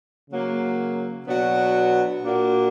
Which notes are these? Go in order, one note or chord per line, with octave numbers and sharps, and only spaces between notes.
C#3 F#3 A#3
B2 F#3 B3 D4 F#4
A#2 A#3 D4 F#4